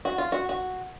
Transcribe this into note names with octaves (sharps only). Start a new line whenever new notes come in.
F#4
F4
F#4
F#4